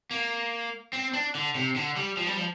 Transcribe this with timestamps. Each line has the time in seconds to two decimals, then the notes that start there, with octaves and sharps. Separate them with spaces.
0.11 A#3
0.93 C4
1.13 D4
1.35 D3
1.55 C3
1.76 D3
1.96 G3
2.17 F3
2.27 G3
2.37 F3